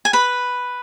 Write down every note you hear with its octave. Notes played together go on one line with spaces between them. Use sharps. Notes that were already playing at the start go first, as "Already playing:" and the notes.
G#5
B4 B5